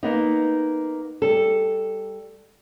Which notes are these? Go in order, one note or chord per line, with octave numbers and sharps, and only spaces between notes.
A#3 B3 D#4
G3 A4